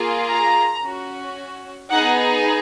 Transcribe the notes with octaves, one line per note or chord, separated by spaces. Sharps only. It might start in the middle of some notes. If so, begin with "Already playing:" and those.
Already playing: A#3 F4 G#4
A#5
C#4 F#4
B3 D#4 G#4 F#5